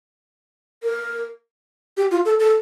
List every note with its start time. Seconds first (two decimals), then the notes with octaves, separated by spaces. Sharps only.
0.83 A#4
1.97 G4
2.11 F4
2.25 A4
2.39 A4